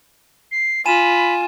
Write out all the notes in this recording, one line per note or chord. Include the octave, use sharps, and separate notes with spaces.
C7
F4 G#5 B5 D#7 E7